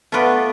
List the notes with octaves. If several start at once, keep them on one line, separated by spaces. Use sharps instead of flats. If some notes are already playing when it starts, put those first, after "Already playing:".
A3 B3 F4 B4 D5